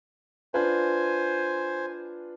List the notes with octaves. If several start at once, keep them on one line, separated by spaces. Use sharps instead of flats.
D4 F4 B4 C5 G#5